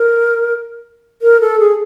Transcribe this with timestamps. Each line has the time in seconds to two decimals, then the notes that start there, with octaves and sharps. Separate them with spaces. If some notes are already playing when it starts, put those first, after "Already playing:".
Already playing: A#4
1.22 A#4
1.41 A4
1.59 G#4